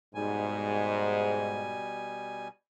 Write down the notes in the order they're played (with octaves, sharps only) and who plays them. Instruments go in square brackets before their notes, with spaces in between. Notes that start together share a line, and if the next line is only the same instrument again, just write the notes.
[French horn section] G#2 [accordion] B2 G3 G#5